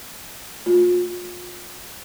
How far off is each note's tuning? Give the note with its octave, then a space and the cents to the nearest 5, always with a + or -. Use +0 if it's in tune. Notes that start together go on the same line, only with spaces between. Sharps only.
A3 +0 F4 +35